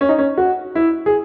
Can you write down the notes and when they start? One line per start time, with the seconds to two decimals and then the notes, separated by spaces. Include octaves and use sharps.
0.01 C#4
0.09 D#4
0.18 C#4
0.37 F#4
0.75 E4
1.06 G#4